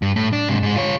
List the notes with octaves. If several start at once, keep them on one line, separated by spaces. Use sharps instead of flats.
G2
A2
D4
G#2 C3
G#2 G#3
F4 C#5